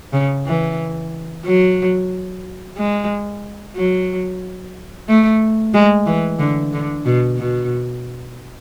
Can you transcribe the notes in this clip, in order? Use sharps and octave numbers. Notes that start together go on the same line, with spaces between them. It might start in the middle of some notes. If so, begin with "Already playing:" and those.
C#3
E3
F#3
G#3
F#3
A3
G#3
E3
D3
D3
B2
B2